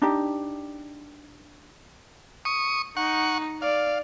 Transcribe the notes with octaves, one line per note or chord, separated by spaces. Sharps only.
D4 D#4 G4
C#6 D#6
D#4 F#5 C#6
D5 F5